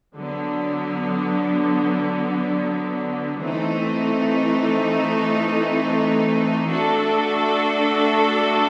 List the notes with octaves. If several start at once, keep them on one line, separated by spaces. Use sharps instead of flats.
D3 F#3 B3
E3 A3 C4 D#4
A3 D4 F#4 A4